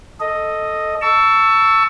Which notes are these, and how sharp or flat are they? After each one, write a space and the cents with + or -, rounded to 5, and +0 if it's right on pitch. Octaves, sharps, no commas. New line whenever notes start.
A4 +0 D#5 +0
A5 +15 C#6 +25 E6 +0